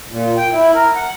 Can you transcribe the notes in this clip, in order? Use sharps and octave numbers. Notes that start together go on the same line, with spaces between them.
A#2
G5
E4
A#4
F#5